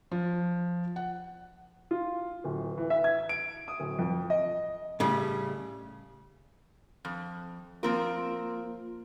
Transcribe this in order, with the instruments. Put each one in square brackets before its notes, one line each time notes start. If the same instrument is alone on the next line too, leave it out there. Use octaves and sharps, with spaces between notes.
[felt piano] F3
F#5
[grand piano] F4
D1
E3
E5
G#6
D7
D#6
D1
F2
D#5
[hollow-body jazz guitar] A2 C#3 G3
[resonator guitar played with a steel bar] F2
[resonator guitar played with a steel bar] F3 C4 A#4 [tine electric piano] A#3 F4